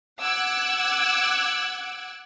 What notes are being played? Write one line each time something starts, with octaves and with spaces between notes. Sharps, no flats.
F#5 D6 E6 F#6 G#6